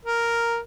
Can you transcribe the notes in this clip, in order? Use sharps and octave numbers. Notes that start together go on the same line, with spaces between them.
A#4